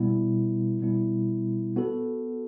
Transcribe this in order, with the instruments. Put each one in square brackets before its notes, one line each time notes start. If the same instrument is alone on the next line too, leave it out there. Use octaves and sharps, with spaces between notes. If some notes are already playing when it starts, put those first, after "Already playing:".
Already playing: [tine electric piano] B2 G3 B3 E4
B2 G3 B3 E4
B3 F#4 A4